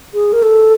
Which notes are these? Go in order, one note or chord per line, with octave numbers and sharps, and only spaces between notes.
G#4
A#4
A4